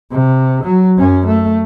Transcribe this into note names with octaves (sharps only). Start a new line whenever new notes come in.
C3
F#3
F#2 C#4
A3